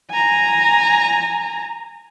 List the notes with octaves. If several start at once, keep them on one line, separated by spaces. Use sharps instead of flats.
G#5 A#5